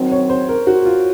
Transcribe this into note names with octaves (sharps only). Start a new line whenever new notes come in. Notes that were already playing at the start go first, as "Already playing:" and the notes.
Already playing: D#3 F#3 C4
C#5
C5
A#4
F#4
F4